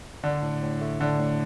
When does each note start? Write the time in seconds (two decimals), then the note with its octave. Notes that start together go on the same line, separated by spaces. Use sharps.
0.24 D3 D4
0.42 A2
0.62 A2
0.81 A3
1.00 D3 D4
1.19 A2